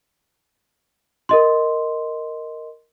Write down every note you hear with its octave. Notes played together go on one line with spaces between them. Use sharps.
A#4 D#5 C6